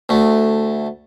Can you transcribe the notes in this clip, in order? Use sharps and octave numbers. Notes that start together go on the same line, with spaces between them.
D2 A3